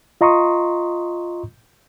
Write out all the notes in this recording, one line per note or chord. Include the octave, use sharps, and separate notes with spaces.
F4 D#5 A#5 C6 C#6 D#6